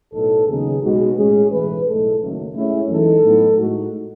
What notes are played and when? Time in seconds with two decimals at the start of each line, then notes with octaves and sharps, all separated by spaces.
0.13 B1 A2 F#3 B3 D#4 A4
0.48 D#2 C#3 F#3 B3 D#4 G#4
0.83 B1 B2 G#3 F#4
1.16 A2 G#3 C#4 G#4
1.52 B1 A2 E3 B4
1.85 B1 A2 G#3 A4
2.20 F#1 F#2 D#3 F#3 A3
2.55 A2 G#3 C#4 E4
2.88 F#2 E3 G#3 D#4 A4
3.23 A2 F#3 B3 D#4
3.58 A2 G#3 D#4 F#4